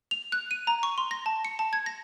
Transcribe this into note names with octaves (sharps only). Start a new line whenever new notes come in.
F7
F#6
D#7
A#5
C#6
C6
A#6
A5
C#7
A5
G#6
A#6